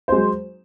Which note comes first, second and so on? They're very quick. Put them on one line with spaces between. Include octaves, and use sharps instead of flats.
C5 G#3 F#3